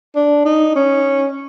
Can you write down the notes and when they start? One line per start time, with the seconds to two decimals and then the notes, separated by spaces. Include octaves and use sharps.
0.16 D4
0.45 D#4
0.75 C#4